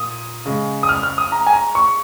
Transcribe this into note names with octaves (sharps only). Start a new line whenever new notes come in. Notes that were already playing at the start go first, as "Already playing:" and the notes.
Already playing: A#2 D#6
C#3 G#3
D#6
F6
F6
D#6
A#5
G#5
A#5
C#6